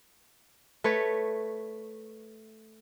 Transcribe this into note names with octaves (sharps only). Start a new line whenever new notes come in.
A3 B4 C#5